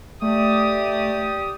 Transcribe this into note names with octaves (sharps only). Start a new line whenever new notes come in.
A3 G4 D5 D#6